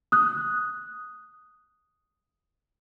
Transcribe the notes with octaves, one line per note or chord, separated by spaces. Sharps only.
D#6 F#6